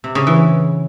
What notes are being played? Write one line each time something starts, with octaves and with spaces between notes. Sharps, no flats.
C3
C#3
E3